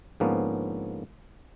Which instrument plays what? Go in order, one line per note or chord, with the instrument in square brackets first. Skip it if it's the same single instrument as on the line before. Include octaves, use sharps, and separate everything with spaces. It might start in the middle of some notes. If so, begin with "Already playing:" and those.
[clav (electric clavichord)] G#2 D3 F3 A#3 B3 C#4